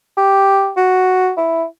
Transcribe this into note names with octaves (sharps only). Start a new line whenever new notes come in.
G4
F#4
E4